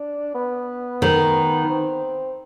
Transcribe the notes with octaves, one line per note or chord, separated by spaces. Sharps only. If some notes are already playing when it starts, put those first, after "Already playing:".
Already playing: D4
B3
D#3
C4